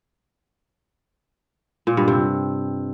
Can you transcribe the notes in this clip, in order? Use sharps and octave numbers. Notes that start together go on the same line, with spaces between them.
A#2
G2
C3